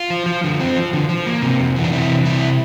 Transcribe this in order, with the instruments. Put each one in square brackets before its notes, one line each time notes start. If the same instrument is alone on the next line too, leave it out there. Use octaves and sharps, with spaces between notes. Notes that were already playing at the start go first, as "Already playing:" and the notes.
Already playing: [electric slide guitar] F4
F3
F3
D3
C4
F3
D3
F3
A#3
C3
F2
E3
D4
C3 E4
E3
C3 E4